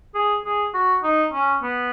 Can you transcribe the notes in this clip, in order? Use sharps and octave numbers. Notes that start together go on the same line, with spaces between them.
G#4
G#4
F#4
D#4
C#4
B3